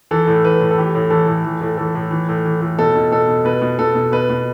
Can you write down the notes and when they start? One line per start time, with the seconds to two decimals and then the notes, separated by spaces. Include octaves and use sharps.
0.11 E3 A4
0.27 A2
0.44 E3 B4
0.61 A2
0.71 A4
0.78 E3 G4
0.95 A2
1.10 E3 A4
1.28 A2
1.45 E3
1.61 A2
1.77 E3 A4
1.95 A2
2.11 E3
2.29 A2
2.45 E3
2.61 A2
2.79 B2 A4
2.95 B2
3.12 B2 A4
3.29 B2
3.45 B2 B4
3.62 B2
3.79 B2 A4
3.95 B2
4.12 B2 B4
4.30 B2